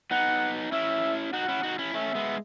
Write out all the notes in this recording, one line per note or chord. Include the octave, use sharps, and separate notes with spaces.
B3 D#4 F#5
C#4 E4 E5
D#4 F#4 F#5
C#4 E4
D#4 F#4
C#4 E4
A3 C#4 E5
G#3 B3